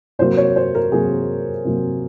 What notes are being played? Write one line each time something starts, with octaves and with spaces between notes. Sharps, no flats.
C3 F#3 A#3 C5
C#5
C5
A#4
C3 F#3 A#3 G#4
C3 F#3 A#3